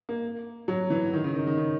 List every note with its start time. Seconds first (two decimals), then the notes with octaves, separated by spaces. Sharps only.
0.09 A#3
0.68 F#3
0.90 E3
1.13 D#3
1.24 C#3
1.35 D#3
1.47 D#3
1.57 C#3